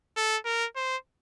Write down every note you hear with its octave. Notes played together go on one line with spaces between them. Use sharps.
A4
A#4
C5